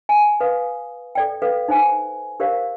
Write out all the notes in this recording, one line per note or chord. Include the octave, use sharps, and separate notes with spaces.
G#5
B4 F5 D#6
A4 D5 G5
A4 B4 F5
D#4 C5 G#5
G4 A#4 C5 D5 F5